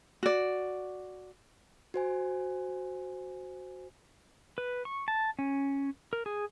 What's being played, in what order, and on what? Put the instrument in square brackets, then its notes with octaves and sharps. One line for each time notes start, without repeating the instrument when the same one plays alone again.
[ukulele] F#4 D5
[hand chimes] F#4 C5 G#5
[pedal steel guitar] B4
C#6
A5
C#4
A#4
G#4